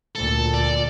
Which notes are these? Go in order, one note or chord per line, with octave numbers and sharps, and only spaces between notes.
D2 A#2 A4
D5